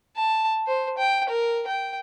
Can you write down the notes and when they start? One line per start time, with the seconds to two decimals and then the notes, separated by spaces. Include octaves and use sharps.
0.16 A5
0.67 C5
0.98 G5
1.29 A#4
1.67 G5